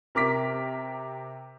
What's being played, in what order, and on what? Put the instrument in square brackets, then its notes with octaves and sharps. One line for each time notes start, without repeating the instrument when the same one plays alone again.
[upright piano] C3 A#4 D6 B6